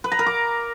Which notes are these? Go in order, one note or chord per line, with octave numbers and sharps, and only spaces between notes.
B4
A#5
A#4
D6